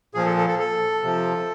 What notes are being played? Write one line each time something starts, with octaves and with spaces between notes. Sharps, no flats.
A#2 F3 G#4
A4
A4
A4
A4
C3 F3